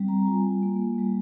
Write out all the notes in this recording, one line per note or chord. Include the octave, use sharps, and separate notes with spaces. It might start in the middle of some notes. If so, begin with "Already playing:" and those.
Already playing: G3 C4
A#5
F4 G#5
A#3
G3